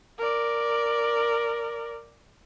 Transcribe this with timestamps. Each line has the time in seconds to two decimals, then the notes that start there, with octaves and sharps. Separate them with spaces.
0.18 A#4 D5